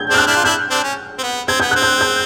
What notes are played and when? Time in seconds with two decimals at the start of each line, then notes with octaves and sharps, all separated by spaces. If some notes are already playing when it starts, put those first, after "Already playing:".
Already playing: G6 G#6
0.10 C4 D4 F6
0.18 F#6
0.27 D4 E4
0.36 F4
0.44 D4 E4 G6
0.70 C4 D4
0.83 C#4
1.18 C4
1.23 B3
1.48 C4 G#6
1.60 B3 G6
1.71 C4 F#6
1.82 G6
2.01 G6